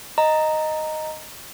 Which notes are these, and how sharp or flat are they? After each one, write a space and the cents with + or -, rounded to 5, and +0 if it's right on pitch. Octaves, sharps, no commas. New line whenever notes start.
D#5 +0 A#5 -5